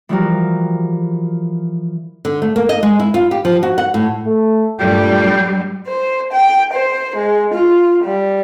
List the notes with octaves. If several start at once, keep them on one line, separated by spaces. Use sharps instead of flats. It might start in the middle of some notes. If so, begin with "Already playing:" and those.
E3 F3 G3 F#4 A#4
D3
A3
A#3
D#5
G#3
E4
F4
G4
F3
F#4
F#5
A2
A3
G2 A#2 G3 A3 G5
C5
G5
C5
G#3
F4
G3